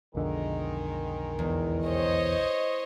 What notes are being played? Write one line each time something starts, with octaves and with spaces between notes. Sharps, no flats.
B1 F2 D3 D#3 G#3 A#4
E2
C5 C#5 D#5